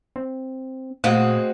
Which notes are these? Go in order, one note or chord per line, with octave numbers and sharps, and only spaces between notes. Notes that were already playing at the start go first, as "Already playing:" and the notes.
C4
A#2 G#3 A3 C4 F#4